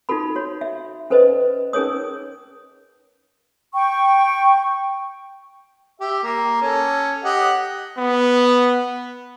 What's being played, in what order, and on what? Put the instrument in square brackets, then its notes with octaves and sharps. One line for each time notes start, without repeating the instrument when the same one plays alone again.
[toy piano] D#4 F4 F#4 A4 B5
F#4 C#5
E5
C#4 A4 B4 C5 D5 D#5
C#4 D#4 G#4 A#4 C#5 D#6
[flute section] G5 C#6
[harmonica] G4 E5
A#3
C#4 A4
G4 D#5 F#5
[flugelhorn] B3